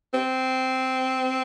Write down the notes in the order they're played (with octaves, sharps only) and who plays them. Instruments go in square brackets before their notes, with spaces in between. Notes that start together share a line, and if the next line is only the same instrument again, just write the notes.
[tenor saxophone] C4